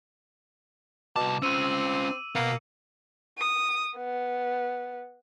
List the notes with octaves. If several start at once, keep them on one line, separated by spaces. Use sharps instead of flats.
C2 B2 A5 D6
C4 C#4 F4 E6 D#7
B2 A#3 B3
D#6
B3